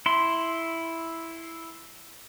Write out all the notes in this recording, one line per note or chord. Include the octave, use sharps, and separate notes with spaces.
E4 C6